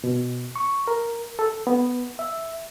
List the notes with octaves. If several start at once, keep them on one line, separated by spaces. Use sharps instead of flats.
B2
C#6
A#4
A4
B3
E5